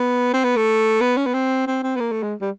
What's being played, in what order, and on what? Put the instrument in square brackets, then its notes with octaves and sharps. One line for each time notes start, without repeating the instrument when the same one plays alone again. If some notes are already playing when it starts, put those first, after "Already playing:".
Already playing: [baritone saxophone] B3
C4
B3
A3
B3
C#4
B3
C4
C4
C4
B3
A#3
A3
G#3
G3